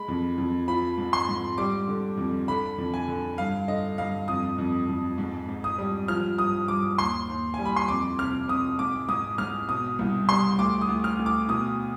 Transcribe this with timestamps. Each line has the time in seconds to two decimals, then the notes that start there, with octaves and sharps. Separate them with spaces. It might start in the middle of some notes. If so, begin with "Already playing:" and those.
Already playing: G#3 B5
0.08 F2
0.38 F2
0.68 F3 B5
0.98 G#2
1.13 C6
1.28 G#2
1.58 G3 D6
1.88 D3
2.17 F2
2.48 D3 B5
2.78 F2
2.94 G#5
3.08 D3
3.38 G2 F5
3.68 D3 D#5
3.98 G2 F5
4.28 F2 D#6
4.58 F2
4.89 F2
5.18 G#2
5.49 G#2
5.64 D#6
5.78 G3
6.08 F3 F6
6.38 G2 D#6
6.68 G2 D6
6.98 D#2 C6
7.29 D#2
7.54 G#5
7.59 G3
7.65 B5
7.76 C6
7.88 F2 D6
8.19 C3 F6
8.48 C3 D#6
8.79 G#2 D6
9.08 G#2 D#6
9.38 G#2 F6
9.69 B2 D#6
9.99 C2
10.29 G3 C6
10.58 D2 D6
10.81 D#6
10.88 D2
11.04 F6
11.19 D2
11.26 D6
11.49 B2 D#6